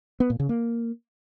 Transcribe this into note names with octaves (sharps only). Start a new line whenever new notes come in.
B3
A#2
C#3
A#3